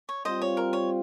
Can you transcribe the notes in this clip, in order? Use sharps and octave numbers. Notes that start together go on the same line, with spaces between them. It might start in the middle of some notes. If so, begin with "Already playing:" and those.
C#5
G3 C4 F4 C5 D#5
C#5
A#4
C#5